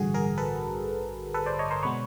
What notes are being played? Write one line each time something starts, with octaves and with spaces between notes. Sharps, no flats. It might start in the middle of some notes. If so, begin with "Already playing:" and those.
Already playing: A1 G2 D3 F#4 G#4
G#4 A#4
A4 B4
A4 B4
C5 D5
C#5 D#5
A#4 C5
B2 G#3 B3 B4 C#5